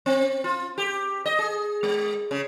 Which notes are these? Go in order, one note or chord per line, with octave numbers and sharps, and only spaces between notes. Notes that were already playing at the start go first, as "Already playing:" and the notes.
C4
F4
G4
D#5
G#4
G#3
C#3